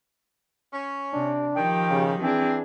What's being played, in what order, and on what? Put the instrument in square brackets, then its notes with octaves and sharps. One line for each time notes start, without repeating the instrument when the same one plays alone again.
[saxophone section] C#4
[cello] C3 [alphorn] D4
[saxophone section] D#3 [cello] F3 G4 [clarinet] G5
[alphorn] C#3
[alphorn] E3 [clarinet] C4 [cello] D4 G#4